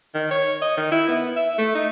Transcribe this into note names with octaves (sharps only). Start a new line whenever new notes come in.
D#3
C#5
D#5
D#3
E4
B3
E5
A3
D#4